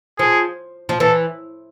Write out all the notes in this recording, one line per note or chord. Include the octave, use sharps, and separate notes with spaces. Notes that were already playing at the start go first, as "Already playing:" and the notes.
F3 G#4
F3
E3 A4